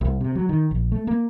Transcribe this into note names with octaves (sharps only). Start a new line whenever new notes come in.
C2
C3
F#3
D#3
A#1
A3
A#3